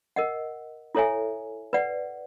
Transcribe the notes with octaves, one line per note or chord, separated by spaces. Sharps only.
A#4 D#5 F#5
E4 A4 C#5 E5 G#5
B4 D5 F#5